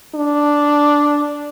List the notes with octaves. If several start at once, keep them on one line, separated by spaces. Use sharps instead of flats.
D4